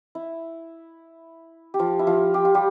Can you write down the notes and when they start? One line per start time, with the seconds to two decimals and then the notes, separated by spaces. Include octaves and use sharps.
0.15 E4
1.74 G4
1.79 F3 F4
1.99 E4
2.07 F3 F4
2.34 G4
2.45 F4
2.54 G3 G4